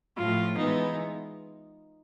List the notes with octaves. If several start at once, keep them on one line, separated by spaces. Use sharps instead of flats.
A2 F3 A3 F4
E3 G#3 B3 D#4